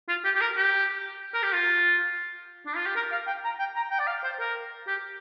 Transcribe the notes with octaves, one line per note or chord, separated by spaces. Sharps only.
F4
G4
G4
A#4
G4
A#4
G4
F4
D4
F4
G4
A#4
F5
G5
A#5
G5
A#5
G5
D5
F5
C5
A#4
G4